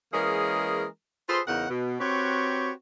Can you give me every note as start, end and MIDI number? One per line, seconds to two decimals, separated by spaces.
0.12 0.84 52
0.12 0.84 56
0.12 0.84 58
0.12 0.84 61
0.12 0.84 68
0.12 0.84 70
1.28 1.40 65
1.28 1.40 68
1.28 1.40 69
1.28 1.40 71
1.28 1.40 72
1.47 1.66 40
1.47 1.66 49
1.47 1.66 63
1.47 1.66 70
1.47 1.66 78
1.69 1.95 47
2.00 2.70 60
2.00 2.70 66
2.00 2.70 67
2.00 2.70 71
2.00 2.70 73